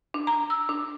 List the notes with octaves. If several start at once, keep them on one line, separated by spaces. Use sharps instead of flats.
D4
A#5
E6
D4